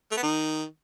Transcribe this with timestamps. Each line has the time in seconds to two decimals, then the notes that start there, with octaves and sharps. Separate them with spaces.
0.11 A3
0.17 B3
0.23 D#3